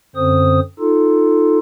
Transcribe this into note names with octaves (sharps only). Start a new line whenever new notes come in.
F#2 D3 C4 C5 D#6
D#4 F4 A4